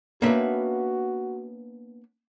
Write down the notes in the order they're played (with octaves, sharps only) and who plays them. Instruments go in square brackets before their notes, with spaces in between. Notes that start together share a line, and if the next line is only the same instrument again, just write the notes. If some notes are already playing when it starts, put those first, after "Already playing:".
[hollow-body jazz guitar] A#3 D4 E5 [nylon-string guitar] B3 C#4 B4 [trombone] F#4